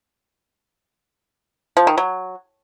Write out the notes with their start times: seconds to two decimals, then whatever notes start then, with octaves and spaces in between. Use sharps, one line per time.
1.77 F3
1.87 D#3
1.98 F#3